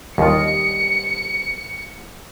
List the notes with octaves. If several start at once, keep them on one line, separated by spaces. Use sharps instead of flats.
D#2 G3 F4 G4 D#5 C#7